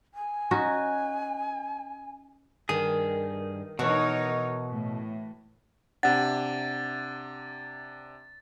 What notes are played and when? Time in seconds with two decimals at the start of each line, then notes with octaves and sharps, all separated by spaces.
0.14 G#5
0.51 C#4 D#4 F#4
2.69 G2 D#3 G#4
3.79 B2 E3 D#4 F#4 A#4 C#5
4.72 A2
6.03 C3 D4 F#5 A6